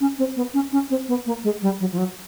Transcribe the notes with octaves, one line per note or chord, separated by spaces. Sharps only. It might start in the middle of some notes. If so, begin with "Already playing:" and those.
C#4
C4
B3
C#4
C#4
C4
B3
A#3
G#3
G3
F#3
F3
F#3